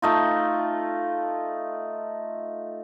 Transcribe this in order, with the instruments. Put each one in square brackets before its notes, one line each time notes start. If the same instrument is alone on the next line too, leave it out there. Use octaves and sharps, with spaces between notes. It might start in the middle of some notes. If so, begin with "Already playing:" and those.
[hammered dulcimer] A3 D#4 F4